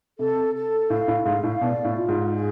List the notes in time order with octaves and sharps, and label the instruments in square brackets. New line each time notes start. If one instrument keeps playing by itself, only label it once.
[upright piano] C3 [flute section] A4
[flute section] A4
[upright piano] A2 [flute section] F5
[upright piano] A2
[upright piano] G#2 [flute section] F5
[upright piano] A2
[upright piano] B2 [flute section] D5
[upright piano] A2
[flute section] F4
[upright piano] G#2
[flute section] G#4